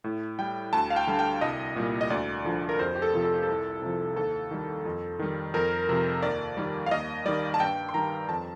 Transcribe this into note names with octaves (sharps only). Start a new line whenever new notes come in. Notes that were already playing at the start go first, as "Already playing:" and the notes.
A2
G3 G5
D2 A5
F5
G5
D3 G3
G5
C2 D#5
A#2 G3
D#5
D2 D5
D3 F3
A#4
F2 C5
G4
A4
C3 F3
A4
G4
A4
C2
C3 F3
D#2 A4
D#3 G3
F2
D#3 G3
F2 A#4
C3 F3
D#2 D5
D#3 G3
F5
D#2 D#5
D#3 G3 D5
A5
G2 G5
C6
D#3 G3 A#5
F2 A5